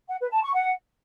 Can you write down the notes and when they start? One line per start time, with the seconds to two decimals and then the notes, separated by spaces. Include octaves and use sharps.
0.08 F#5
0.19 B4
0.31 A5
0.42 C#6
0.53 F#5